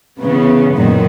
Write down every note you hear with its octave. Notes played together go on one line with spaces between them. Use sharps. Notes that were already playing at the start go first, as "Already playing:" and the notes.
C#3 E3 B3
F#2 A#2 D#3 F#3